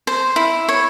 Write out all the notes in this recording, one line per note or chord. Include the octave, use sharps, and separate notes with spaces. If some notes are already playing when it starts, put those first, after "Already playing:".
C5
E4
C#5